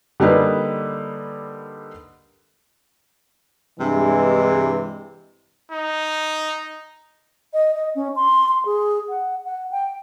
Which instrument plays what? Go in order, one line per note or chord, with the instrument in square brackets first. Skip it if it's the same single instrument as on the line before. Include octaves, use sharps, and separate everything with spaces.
[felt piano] D3 G3 A#3 D#4 B4
[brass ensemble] G2 E3 G#3 [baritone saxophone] C3
[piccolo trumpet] D#4
[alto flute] D#5
D#5
C#4
C6
C6
G#4
F#5
F#5
G5